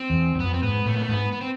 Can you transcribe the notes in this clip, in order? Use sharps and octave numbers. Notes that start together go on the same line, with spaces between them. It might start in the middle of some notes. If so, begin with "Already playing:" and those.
Already playing: C4
E2
E2
F2 B3
C4
G#2 B3
A2 A3
B3
A3
G#2 B3
B3
C4